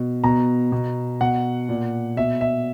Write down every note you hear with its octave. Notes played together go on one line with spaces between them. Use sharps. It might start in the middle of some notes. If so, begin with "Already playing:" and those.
Already playing: B2
B2 A#5
B2
B2 F#5
A#2
B2 E5
E5